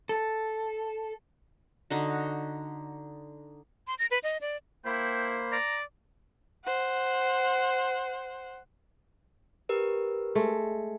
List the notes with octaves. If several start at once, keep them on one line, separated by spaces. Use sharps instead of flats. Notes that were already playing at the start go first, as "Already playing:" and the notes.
A4
D3 D#4 F#4
C6
A#6
B4
D#5
D5
A#3 E4 C5 G5 B5
D5 A#5
C5 F#5
G4 A#4 B4
G#3 A3